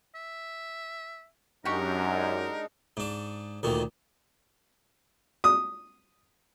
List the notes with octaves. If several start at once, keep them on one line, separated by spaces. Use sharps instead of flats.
E5
F#2 G#3 D4 D#4 G4 A#4 F#5 C#6
G#2 D4
D2 A#2 D#3
D#6